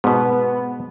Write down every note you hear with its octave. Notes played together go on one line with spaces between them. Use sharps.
G#2 B2 B3